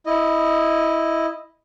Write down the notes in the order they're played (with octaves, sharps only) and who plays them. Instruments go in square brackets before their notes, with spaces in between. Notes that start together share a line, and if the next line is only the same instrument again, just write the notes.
[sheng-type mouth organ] E4 D#5